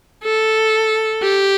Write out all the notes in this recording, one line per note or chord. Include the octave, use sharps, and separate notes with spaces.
A4
G4